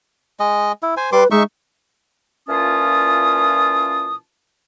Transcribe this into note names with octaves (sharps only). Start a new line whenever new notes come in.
G#3 D#5
E4
C5 G#5
G3 B4 C6 D6
G#3 D#4 E5 C#6
A#2 E3 C#4 F4 A5 D#6